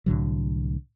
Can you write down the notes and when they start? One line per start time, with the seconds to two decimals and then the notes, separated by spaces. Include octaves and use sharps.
0.06 C2 A2 D3 F#3